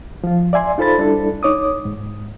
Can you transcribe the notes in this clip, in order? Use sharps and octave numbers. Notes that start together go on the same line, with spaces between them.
F3 F4
D5 E5 G#5 C6
D#4 F4 A4 C5 B5 A6
G3 D4 E4 A4
D#4 C#5 D6 D#6
G#2